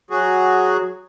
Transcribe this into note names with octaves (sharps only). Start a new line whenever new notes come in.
F#3 F#4 G#4